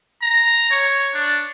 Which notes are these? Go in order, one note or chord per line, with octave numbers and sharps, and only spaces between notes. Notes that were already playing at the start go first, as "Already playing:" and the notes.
A#5
C#5
D4